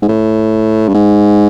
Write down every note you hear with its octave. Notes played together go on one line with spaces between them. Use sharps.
G#2
A2
G2
G#2